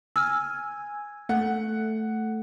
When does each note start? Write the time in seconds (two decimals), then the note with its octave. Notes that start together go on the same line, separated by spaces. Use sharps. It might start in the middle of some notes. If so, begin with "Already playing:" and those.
0.16 G#5 E6 F6
1.29 A3 F#5